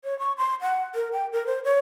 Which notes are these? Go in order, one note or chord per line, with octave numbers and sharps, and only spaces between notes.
C#5
C#6
C6
F#5
A#4
G5
A#4
C5
C#5